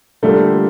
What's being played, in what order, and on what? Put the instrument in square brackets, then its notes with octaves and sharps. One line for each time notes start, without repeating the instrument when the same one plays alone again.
[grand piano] D3 G3 A#3 F4 [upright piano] A3